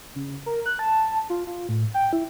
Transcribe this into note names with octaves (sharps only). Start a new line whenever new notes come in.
C#3
A#4
F#6
A5
F4
F4
A2
G5
E4